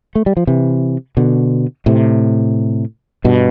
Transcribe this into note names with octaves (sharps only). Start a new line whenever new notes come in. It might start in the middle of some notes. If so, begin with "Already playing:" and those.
A3
G3
F3
C3 E3
B2 D3
A2 C3
G2 B2